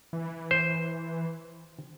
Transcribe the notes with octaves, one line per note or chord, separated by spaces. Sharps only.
E3
C5